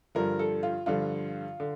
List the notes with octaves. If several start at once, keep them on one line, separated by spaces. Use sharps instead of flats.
G2 D3 F3 A#4
A4
F4
G2 D3 F3 F4
D3